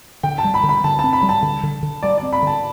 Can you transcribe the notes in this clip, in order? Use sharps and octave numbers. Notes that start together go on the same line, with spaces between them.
D3 G5
A5
G3
B5
D3
B5
D3 A5
C4 A5
B5
G3
A5
D3
D3
D3
G3 D5
D5
C4
B5
D3 A5